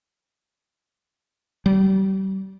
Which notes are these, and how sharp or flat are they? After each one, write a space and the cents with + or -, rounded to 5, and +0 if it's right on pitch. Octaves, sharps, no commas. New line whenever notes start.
G3 -35